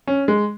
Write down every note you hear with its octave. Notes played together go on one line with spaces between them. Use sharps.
C#4
G#3